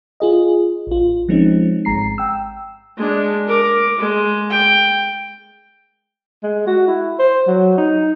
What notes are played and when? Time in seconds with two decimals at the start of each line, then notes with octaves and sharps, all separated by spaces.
0.20 F4 G#4 D#5
0.87 A1 F4
1.29 F3 G#3 C4 C#4 D#4
1.85 G#1 G#3 A#5 C7
2.18 G5 E6
2.97 G#3 D4
3.47 A#4 D6
3.98 G#3
4.50 G5
6.43 G#3
6.67 F#4
6.87 E4
7.19 C5
7.47 F#3
7.78 D#4